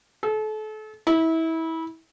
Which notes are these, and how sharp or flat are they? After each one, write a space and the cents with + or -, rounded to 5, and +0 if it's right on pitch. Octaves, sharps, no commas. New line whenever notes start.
A4 -35
E4 -25